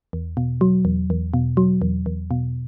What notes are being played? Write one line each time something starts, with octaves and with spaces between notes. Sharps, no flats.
E2
B2
F#3
E2
E2
B2
F#3
E2
E2
B2